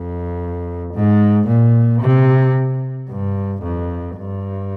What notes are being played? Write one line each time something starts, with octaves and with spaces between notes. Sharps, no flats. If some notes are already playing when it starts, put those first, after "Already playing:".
Already playing: F2
G#2
A#2
C3
G2
F2
G2